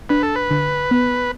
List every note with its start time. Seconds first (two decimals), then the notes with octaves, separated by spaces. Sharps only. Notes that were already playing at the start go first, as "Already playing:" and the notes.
0.09 D4 B4
0.23 A4
0.36 B4
0.51 D3
0.91 B3